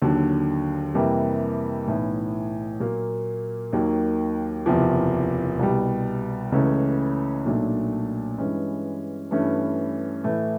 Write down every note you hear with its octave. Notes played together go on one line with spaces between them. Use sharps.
D#2 D3 F#3
F2 C3 E3 G3 A#3
B1 A2 E3
A#2 F#3 A#3
D#2 D#3 F#3 A#3
F#1 E2 C3 F3
C2 B2 G3
C#2 C#3 E3 A3 C#4
B1 A#2 F#3 A3 D4
G2 E3 G#3 C#4
G2 E3 A3 C#4
A2 E3 A3